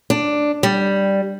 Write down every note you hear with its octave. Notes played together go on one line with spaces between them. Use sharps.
D4
G3